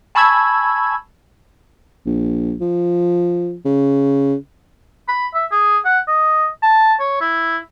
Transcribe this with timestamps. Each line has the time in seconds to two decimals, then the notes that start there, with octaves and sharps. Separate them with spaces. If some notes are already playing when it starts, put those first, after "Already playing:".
0.15 G#5 A5 B5 C#6 E6 G#6
2.06 A#1
2.61 F3
3.65 C#3
5.08 B5
5.34 E5
5.51 G#4
5.85 F#5
6.08 D#5
6.63 A5
7.00 C#5
7.21 E4